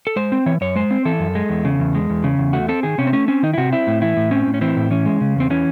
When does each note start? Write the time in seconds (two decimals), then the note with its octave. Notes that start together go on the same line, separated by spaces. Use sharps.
0.07 A4
0.16 G#3 C5
0.32 C4
0.46 E3 C#5
0.61 F#2 C#5
0.76 G#3 C5
0.91 C4
1.05 E3 A4
1.20 F#2
1.35 G#3
1.49 E2
1.65 C#3
1.79 E2
1.95 G#3
2.10 E2
2.24 C#3
2.38 E2
2.53 A3 F#4
2.68 C4 A4
2.83 D#3 G#4
2.98 C3 C#4
3.07 C4
3.13 A3 C#4
3.28 C4 C#4
3.43 D#3 D#4
3.53 E4
3.58 C3 F#4
3.72 C4 E4
3.87 A2
4.02 E3 E4
4.17 A2
4.31 C4 C#4
4.47 A2
4.54 C#4
4.61 E3 C4
4.76 A2
4.91 E3 C#4
5.06 G#3
5.21 C#3
5.36 E2 C4
5.50 E3 C#4